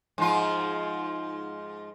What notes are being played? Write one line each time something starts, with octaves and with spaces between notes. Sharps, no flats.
G#2 F3 F4